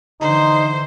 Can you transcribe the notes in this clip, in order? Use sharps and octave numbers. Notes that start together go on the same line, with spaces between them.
D3 E3 D#4 C5